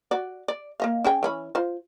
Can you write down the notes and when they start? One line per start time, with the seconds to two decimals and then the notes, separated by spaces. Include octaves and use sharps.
0.11 F#4 D5
0.48 D5
0.80 A#3 D#5 F5
1.05 C#4 G#4 G5
1.23 E3 C#4 B5
1.55 F4 C5